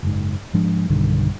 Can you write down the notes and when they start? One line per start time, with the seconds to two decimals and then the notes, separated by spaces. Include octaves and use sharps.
0.03 F#1 G#2
0.53 G#2 F3 G#3 D4
0.90 B1 G2 D3 D#3